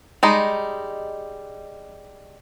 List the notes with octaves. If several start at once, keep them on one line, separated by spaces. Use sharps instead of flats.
G3 G#3 D#4